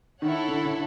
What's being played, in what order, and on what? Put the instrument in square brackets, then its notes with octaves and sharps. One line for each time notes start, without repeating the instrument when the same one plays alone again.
[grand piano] D#3 [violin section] E4 A4 C#5 F#5
[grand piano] D3
D3